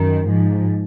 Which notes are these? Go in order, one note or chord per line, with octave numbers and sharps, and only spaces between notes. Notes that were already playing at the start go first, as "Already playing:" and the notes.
Already playing: F#2 D#3
G#2 F3